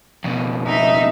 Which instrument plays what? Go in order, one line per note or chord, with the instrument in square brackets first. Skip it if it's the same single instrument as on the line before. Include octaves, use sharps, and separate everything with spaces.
[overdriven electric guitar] F2 B2
[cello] D#4 E5